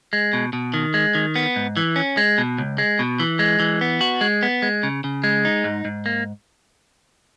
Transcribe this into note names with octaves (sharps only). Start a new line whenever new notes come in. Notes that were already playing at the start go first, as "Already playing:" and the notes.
G#3
B2
B2
D#3
G#3
D#3
B3
G#2
E3
C#4
G#3
B2
C#2
G#3
B2
E3
G#3
E3
B3
F#4
G#3
B3
G#3
C#3
C#3
G#3
D#4
G#2
G#2
A#3